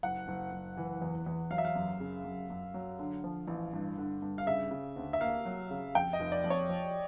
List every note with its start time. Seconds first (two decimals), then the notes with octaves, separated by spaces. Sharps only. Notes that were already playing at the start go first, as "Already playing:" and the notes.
0.03 F#1 F#5
0.28 F#1
0.52 F#1
0.77 E3
1.02 E2
1.26 E2
1.50 F#3 F5
1.58 E5
1.65 F5
1.75 F#2
2.00 C#3
2.24 F#2
2.50 F#2
2.74 F#3
2.99 D3
3.24 F3
3.48 A1
3.73 G2
3.98 D3
4.22 G2
4.38 F5
4.46 C#3 E5
4.71 C#3
4.96 D2
5.13 E5
5.20 A#3 F5
5.45 F#3
5.70 C#3
5.95 F2 G5
6.13 D#5
6.20 F1
6.32 D5
6.44 F2
6.50 C#5
6.69 F3